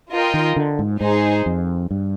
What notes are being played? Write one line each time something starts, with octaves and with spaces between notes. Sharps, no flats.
F4 A#4 D#5 G5
D#3
D3
G#2
G#2 D#4 G#4 C5
F2
G2